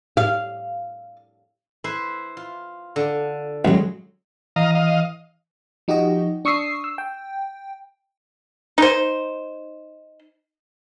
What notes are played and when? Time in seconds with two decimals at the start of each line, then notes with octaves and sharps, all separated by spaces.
0.17 F5
1.84 E4 B4 C5
2.37 F4
2.96 D3
3.65 A1 F#3 G#3
4.56 E3 D#5 F5 A#5
4.75 D#5 F5
5.88 F3 D#4 F#4 G4 D#5
6.45 D4 C#6 D#6 E6 C7
6.84 E6
6.98 G5
8.78 D#4 C5